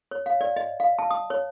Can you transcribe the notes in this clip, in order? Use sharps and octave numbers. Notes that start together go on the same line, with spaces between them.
C#5
F5
D5
D#5
F5
A5
D#6
C#5